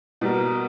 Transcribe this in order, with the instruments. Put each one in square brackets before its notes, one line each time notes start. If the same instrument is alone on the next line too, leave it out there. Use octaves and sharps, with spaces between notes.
[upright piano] B2 G3 A#3